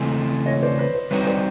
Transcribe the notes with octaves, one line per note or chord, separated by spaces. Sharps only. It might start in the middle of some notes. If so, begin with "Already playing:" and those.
Already playing: C#3 E3 A3 C4
C#5 D#5
C5 D5
B4 C#5
C5
G3 C4 D#4 F#4 B4 C#5
C5 D5